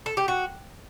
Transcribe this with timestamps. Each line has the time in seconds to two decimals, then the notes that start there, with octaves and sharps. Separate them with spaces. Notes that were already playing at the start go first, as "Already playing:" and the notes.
0.06 A4
0.17 G4
0.28 F#4